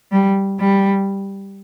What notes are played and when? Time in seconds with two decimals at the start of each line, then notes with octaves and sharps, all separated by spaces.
0.12 G3
0.60 G3